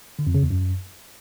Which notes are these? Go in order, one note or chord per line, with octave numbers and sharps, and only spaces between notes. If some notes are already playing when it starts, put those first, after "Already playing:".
D3
F2
C#3
E2
F#2